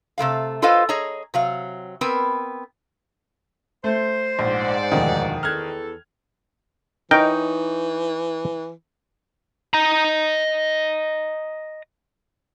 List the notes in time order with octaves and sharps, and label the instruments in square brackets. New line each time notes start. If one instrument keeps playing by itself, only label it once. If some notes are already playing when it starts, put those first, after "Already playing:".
[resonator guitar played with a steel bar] C3 E3 A3 F5
F4 A4 B4 C5 D#5 F5
G#4 C#5 D#5 A#5
C3 F#3 F5
B3 C4 A#4 B4
[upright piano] A3 [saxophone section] C5
[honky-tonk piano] A#1 [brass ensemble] G#2 D5 F#5
[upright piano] E1 D2 F3 [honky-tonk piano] D#3
[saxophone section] E2 A4 [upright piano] F6 F#6 G#6
[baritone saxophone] E3 [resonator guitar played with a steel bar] D#4 C#5 [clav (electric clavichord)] A#4 G5
[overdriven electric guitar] D#5 A#5